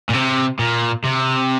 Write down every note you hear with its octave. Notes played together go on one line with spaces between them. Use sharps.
A#2
C3
A#2
C3